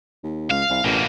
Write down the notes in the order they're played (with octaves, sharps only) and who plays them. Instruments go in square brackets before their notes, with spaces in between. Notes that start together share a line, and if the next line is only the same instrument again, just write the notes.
[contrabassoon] D#2
[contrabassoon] C#2 [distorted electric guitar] F5
[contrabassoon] C2
[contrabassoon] A1 [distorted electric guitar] B2 A#3